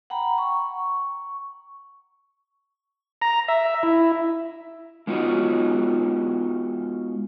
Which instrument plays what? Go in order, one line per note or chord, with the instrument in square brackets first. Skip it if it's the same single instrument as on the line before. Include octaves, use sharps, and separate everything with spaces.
[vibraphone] F#5 G5 A#5 B5
C#6
[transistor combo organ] A#5
E5
E4
[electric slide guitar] G#3 B3 D#4 F4 F#4 C#5